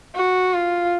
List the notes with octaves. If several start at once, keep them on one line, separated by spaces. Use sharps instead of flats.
F#4
F4